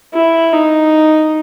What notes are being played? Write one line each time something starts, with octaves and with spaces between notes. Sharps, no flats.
E4
D#4